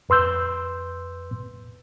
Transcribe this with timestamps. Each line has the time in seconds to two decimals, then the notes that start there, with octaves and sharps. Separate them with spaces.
0.09 F2 B4 C6 E6 G6